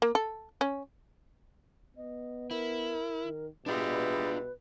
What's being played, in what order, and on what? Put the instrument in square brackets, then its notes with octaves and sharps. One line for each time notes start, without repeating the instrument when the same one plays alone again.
[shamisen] A#3
A4
C#4
[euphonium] B3 [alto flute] D#5
[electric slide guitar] E4 [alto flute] A#4
[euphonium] D#3
[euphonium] B2 [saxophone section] G3 G#3 E5 [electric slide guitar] D4 F4 [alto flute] B4